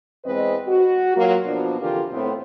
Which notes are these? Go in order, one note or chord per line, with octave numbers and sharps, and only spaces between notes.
E2 G#3 C4 B4 D#5
F#4
F#3 A#3 F4
B2 F3 B3 D4
F2 D3 E3 F4 G4 A#4
A2 B3 C4